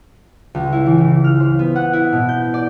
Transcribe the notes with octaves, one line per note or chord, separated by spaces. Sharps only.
C#2
E4
E3
C#3
F6
C5
B3
F#5
E4
B2
G6
D5